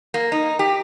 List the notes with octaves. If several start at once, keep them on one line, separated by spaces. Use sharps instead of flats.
A#3
D#4
G4